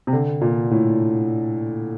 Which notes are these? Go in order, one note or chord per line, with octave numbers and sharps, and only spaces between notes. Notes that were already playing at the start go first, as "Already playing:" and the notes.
C3
D3
A#2
A2